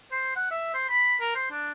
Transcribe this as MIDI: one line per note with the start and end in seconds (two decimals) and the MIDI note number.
0.12 0.31 72
0.36 0.48 78
0.51 0.72 76
0.74 0.85 72
0.89 1.16 83
1.20 1.31 70
1.35 1.48 72
1.51 1.72 62